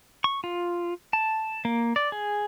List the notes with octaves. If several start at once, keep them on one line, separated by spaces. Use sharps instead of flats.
C#6
F4
A5
A#3
D5
G#4